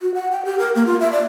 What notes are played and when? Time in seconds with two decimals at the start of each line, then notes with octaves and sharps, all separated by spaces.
0.02 F#4
0.14 F#5
0.32 G5
0.45 G4
0.59 A#4
0.75 A#3
0.86 F4
1.00 E5
1.12 D5